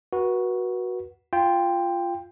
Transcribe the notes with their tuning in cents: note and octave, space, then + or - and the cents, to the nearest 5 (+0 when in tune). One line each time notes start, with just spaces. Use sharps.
F#4 +0 B4 -35
F4 -10 G5 +10